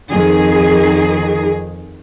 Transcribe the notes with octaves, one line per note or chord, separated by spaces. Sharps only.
F2 D#3 G#4